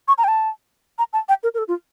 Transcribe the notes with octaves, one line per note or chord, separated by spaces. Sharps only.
C#6
A#5
G5
A5
A#5
A5
G5
A#4
A#4
A4
F4